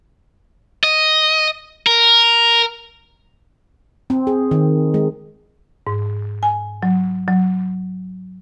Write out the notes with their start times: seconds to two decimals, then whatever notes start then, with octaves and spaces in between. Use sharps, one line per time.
0.83 D#5
1.87 A#4
4.10 C4
4.27 G#4
4.51 D#3
4.94 G#3
5.87 G#2
6.43 G#5
6.83 F#3
7.28 F#3